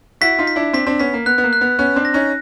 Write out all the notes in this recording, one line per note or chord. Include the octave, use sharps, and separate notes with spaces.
E4 F#4 B6
D#4 F4
B6
D4 E4
C4 D4 B6
C4 D4
B3 C#4 B6
A#3
B3 F#6
B3
A#3
F#6
B3
B3 C#4 F#6
C4 D4
A#6
C#4 D#4